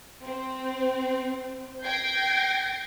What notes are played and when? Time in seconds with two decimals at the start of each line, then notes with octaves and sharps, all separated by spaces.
0.25 C4
1.84 G5 G6 G#6 A#6 C7 D7